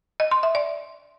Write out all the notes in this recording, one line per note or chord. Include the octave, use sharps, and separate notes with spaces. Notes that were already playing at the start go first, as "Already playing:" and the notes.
D#5
C6
E5
D5